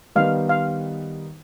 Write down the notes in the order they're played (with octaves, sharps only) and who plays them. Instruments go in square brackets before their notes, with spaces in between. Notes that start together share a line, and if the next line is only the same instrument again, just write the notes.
[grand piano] D#3 G3 B3 D#4 [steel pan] F5
[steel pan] F5